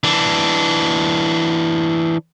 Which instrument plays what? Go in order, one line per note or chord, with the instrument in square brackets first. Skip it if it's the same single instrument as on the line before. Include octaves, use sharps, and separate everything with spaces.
[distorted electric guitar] E3 D4